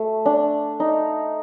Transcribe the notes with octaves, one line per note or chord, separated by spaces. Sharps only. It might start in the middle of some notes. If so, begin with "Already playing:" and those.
Already playing: A3
D4
D#4